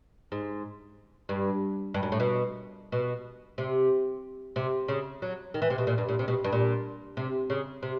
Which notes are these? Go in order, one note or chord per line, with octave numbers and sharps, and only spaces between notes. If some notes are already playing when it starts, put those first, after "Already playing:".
G#2
G2
G2
F#2
A2
B2
B2
C3
C3
C#3
F#3
D#3
E3
C3
B2
A#2
G2
A#2
C3
B2
G2
A#2
C3
C#3
C3